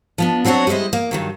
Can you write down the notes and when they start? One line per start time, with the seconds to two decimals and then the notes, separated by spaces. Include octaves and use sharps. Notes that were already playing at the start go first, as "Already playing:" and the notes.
0.18 F3 B3 D4
0.45 F#3 C4 D4 F#4 C#5
0.67 G3 G#3 E4 C5 D#5
0.93 A#3
1.11 G2 D#3 F#3